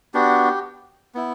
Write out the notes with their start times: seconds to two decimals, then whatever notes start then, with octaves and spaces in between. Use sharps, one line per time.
0.14 B3 D4 F#4 G4
1.15 B3 E4